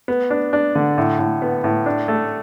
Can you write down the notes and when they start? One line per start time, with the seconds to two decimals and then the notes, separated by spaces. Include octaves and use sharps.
0.08 B3
0.30 D4
0.53 D4
0.75 D3
0.98 A2
1.19 A2
1.42 B3
1.64 A2
1.86 D4
2.08 A3